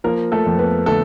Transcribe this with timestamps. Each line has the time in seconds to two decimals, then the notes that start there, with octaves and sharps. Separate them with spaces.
0.04 F3 A#3 A#4
0.32 A3 A4
0.46 F2
0.59 B3 B4
0.86 D3 A3 A4